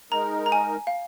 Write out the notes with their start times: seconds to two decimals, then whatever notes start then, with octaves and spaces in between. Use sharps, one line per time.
0.11 G#3 D#4 A#4 A#5
0.46 A#5
0.52 G#5
0.87 F5